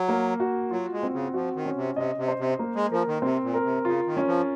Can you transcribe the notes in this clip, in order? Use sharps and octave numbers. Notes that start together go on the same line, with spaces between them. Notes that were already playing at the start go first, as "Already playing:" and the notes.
Already playing: F#3
A#3
F#4
F#3 F4
G#3
C4
C#3
F3 F#4
D#3
C#4
C3
C3 D#5
C3
C5
C3
A#3
G#3
F3 A#4
D#3
C3 C4
A#2
A#4
C3
C#3 F4
D#3
C#4
F3